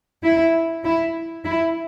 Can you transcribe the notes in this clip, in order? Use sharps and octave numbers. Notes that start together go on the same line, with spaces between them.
E4
E4
E4